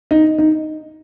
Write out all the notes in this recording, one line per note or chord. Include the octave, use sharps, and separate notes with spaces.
D#4
D#4